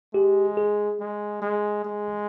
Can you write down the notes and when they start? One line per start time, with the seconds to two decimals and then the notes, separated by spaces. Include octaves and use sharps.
0.14 G#3 G4
0.57 G#4
1.00 G#3
1.42 G#3
1.85 G#3